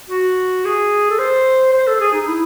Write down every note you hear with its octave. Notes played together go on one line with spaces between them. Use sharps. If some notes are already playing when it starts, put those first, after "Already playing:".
F#4
G#4
A4
C5
C5
A4
G#4
D#4
E4